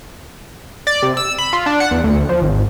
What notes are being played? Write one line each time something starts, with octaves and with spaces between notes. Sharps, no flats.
D5
C3
E6
B5
F4
D4
F#5
E2
D2
F3
G#1